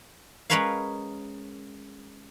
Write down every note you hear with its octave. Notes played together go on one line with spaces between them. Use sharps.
G#3 C#4 A#4 B4 C#5 F5